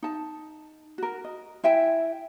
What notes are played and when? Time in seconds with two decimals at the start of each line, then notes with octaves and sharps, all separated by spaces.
0.03 D#4 A5
0.98 F#4 A#4
1.25 D#5
1.64 E4 E5 G5 G#5